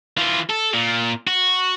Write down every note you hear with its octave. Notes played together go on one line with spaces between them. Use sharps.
E3 F4
A4
A#2
F#4